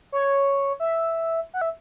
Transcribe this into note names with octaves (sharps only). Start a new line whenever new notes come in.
C#5
E5
F#5
E5